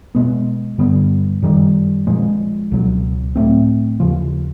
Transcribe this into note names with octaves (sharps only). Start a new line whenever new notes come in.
B2 G#3 B3
G2 D3 G3 B3
F#2 D#3 G3
A#2 F3 G#3
C#2 B2 F#3
A2 F#3 A3 C4
D#2 C#3 F3